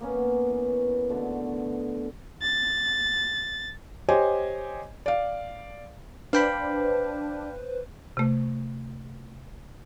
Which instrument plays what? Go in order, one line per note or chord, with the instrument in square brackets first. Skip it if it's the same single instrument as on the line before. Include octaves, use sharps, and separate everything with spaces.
[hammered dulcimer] A#3 B3 C#4
E3
B2 D3 A3 B3
[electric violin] A6
[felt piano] G4 C5 C#5 D#5 G#5
D5 F5
[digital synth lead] D4 [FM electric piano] B4 C5 [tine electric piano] F5 G5 B5
[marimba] C3 A3